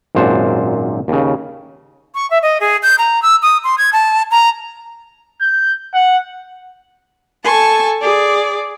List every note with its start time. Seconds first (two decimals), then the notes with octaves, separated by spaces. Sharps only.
0.15 G#1 F#2 A#2 C5 F#5 A5
1.08 D#2 C#3
2.15 C#6
2.31 E5
2.43 D#5
2.60 G#4
2.83 G6
2.98 A#5
3.22 E6
3.42 D#6
3.64 C6
3.78 G#6
3.93 A5
4.31 A#5
5.41 G6
5.94 F#5
7.45 A4 G#5 A5 C#6
8.02 G#4 D5